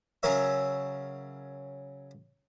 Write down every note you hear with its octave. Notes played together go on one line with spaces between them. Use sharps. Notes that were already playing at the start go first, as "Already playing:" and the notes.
C#3 F#3 C#4 A#4 C#5 E5